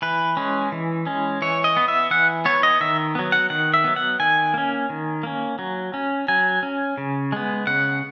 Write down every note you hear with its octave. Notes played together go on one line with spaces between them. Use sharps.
E3 B4
G#3 C#4
E3
G#3 C#4
E3 C#5
D#5
B3
E5
E3 F#5
B3 C#5
D#5
D#3 E5
F#3 B3
F#5
D#3 F#5
E5
F#3 B3
F#5
D#3 G#5
A#3 C#4
D#3
A#3 C#4
F#3
C#4
F#3 G#5
C#4
C#3
G#3 B3
C#3 F#5